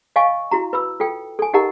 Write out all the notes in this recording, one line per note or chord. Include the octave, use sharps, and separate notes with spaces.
D#5 F5 G#5 C#6
E4 F#4 A#5
B4 B5 E6
F4 A4 G5
A4 G#5
D#4 G4 A#4 D#5 F#5 A#5